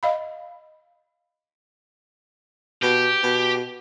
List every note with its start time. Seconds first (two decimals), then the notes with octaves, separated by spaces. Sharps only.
0.03 D#5 F5 B5
2.83 B2 G4
3.23 B2